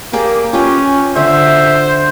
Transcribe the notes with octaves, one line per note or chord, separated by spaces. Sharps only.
A#3 G4 G#4 D5
C#4 F4 G4 B4
D3 C5 E5